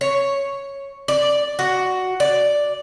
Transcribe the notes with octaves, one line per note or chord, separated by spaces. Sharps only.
C#5
D5
F#4
D5